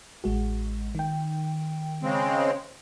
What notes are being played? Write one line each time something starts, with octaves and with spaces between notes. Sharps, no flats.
A1 G#3 F#4
D#3 G5
C#3 G#3 C4